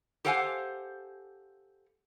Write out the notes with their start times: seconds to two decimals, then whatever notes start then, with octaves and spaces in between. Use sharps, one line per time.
0.25 G4 A4 C5 F5 F#5 G#5